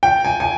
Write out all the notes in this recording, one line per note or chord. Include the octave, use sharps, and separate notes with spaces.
G5
G#5
G#5